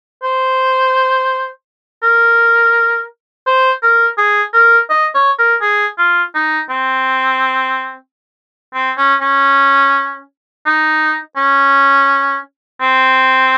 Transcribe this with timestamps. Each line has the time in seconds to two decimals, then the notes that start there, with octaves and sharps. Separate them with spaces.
0.23 C5
2.03 A#4
3.46 C5
3.83 A#4
4.18 G#4
4.53 A#4
4.90 D#5
5.15 C#5
5.39 A#4
5.61 G#4
5.98 F4
6.34 D#4
6.70 C4
8.74 C4
8.98 C#4
9.21 C#4
10.66 D#4
11.37 C#4
12.81 C4